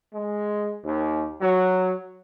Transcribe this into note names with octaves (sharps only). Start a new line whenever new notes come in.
G#3
D#2
F#3